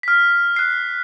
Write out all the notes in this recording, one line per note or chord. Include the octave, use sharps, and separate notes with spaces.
F6 B6
F#6 C7